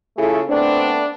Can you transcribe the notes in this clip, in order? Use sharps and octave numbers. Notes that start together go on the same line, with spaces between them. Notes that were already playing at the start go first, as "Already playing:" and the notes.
C#3 A3 E4 F4 G#4 A4
A3 B3 C4 D4